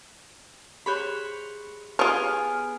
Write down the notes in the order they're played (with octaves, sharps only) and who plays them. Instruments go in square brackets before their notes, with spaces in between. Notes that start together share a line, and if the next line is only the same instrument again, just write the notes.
[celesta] G4 G#4 F#6 [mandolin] C5 C#5 B5
[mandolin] B3 G#4 [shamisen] F4 C#5 [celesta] G4 D7 F7 [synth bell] F6